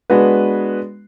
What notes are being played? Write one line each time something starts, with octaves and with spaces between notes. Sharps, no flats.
G#3 B3 D4 F#4 B4